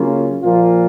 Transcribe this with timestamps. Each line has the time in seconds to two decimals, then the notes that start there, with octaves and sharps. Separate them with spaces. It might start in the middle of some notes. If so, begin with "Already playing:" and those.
Already playing: C#3 F#3 A#3 C#4 F4
0.42 A#2 F3 A#3 F4